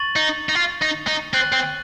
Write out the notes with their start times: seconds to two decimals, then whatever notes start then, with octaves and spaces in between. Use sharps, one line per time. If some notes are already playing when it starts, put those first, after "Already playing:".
Already playing: C#6 A6 D#7 F#7
0.16 D#4
0.49 D#4
0.55 F4
0.82 D#4
1.07 D#4
1.33 C4 F#6 A6 D#7 F#7
1.52 C4